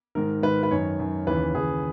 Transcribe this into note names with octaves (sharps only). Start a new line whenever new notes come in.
G#2 D#3 A#4
G#2 D#3 B4
B4
F#2 D#3 C#5
F#2 D#3
D#2 C#3 E3 B4
D#2 C#3 E3 G#4